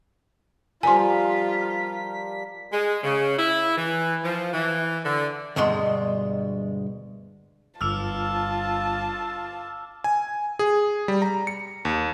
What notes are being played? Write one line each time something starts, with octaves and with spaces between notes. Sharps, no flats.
F3 G3 F4 A#4 G#5 C6 B6
G#3
C#3
E4
E3
F3
E3
D3
D2 G2 B2 G#3 C6
G1 F4 A5 D6 E6 F6 F7
G#5
G#4
G3
A#5
C#7
D#2